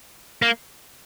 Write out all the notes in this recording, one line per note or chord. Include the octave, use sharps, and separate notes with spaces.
A#3